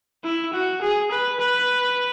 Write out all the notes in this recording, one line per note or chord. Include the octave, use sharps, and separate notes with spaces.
E4
F#4
G#4
B4
B4